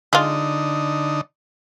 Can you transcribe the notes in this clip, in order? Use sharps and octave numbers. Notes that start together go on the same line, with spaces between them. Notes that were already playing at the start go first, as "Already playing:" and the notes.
D3 G#3 D#4 F4